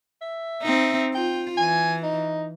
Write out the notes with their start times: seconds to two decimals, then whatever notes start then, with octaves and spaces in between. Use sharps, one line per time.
0.21 E5
0.63 C4 D#4
1.15 F4 G5
1.57 E3 G#5
2.03 D#4